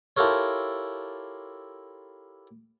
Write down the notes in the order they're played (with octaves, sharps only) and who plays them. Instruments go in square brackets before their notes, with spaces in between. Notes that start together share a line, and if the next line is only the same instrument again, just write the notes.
[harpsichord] E4 F4 G4 A4 A#4 C#5